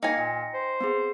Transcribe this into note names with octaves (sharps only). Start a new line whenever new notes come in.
A#3 D#4 G5 G#5 A#6 C#7
A#2
C5
B3 C4 G#4